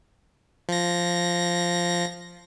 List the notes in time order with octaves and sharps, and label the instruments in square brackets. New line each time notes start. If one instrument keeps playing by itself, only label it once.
[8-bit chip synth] F3 A#6